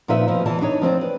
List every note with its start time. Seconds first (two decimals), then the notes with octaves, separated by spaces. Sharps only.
0.08 A#2 F3 D#4 F4 B4 E5
0.28 B2 F3
0.46 E2 E3 A5
0.61 D4 D#4 C#5
0.82 F3 C4 C5 D5
1.01 B4